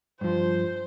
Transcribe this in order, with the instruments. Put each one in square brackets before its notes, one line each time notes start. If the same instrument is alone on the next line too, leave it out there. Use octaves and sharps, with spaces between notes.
[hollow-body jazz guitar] G2 F3 [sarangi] C5